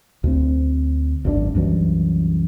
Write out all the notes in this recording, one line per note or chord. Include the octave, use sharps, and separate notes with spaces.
D2 C4
G#1 F#2 D#3 D4
C2 F#2 E3 F#3